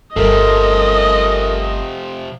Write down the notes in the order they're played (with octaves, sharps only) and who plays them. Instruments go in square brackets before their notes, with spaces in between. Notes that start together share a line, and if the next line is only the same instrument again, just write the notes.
[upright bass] G1 G3 [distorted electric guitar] C3 F3 [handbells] A4 A#4 [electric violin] D#5